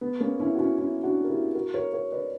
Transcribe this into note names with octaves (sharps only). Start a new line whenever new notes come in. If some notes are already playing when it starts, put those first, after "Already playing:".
B3
A#3 C#4
C#4 E4
F#4
C#4 E4
C#4 E4
D4 F#4
A#4
E4 G4
F#4 A#4
A#4 C#5
A#4 C#5
B4 D5